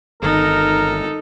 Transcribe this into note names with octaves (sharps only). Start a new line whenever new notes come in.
G1 D#3 D#4 A4 A#4